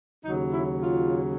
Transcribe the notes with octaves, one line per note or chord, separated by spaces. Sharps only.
D#2 C#3 F#3 D#4
E4
F4